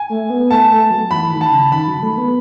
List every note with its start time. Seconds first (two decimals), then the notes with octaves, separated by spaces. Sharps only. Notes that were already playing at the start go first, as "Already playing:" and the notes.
Already playing: G#5
0.09 A3
0.30 B3
0.50 A3 A5
0.71 A3
0.91 F#3
1.11 E3 B5
1.31 D#3
1.41 A5
1.52 C#3
1.72 D#3 B5
1.88 F#3
2.03 A3
2.18 B3